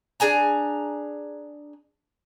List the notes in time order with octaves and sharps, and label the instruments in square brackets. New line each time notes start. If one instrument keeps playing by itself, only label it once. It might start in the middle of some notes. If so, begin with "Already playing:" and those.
[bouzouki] D4 G#4 G#5 A#5